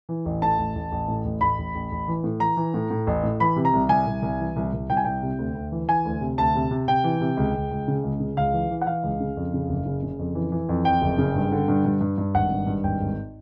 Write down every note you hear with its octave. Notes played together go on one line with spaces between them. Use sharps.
E3
A1
A2 A5
A1
A1
A1
A2
A1
A1 B5
A1
A1
A1
E3
A2
E3 A#5
E3
A2
A2
A1
A2
E3 B5
C3
A#5
C2
C2 G#5
C2
C2
E3
C2
C2
C2 G5
G#5
C2 G5
C3
D2
D2
E3
E3 G#5
D2
C3
D2 A5
C3
C3
C3 G5
E3
C3
C#2
C#2
C#2
C#3
C#2
C#3
C#2 F5
E3
E3
F#5
E3 F5
C#2
C#3
F2
C#3
F#1
C#3
C#3
F2
E3
E3
F2
F2 G5
F#1
C#3
G2
D3
G2
G2
G2
G2
G#1 F#5
G2
G2
G#1 G5
G#1